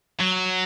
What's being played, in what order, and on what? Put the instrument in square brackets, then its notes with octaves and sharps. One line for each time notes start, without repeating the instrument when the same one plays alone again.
[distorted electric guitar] F#3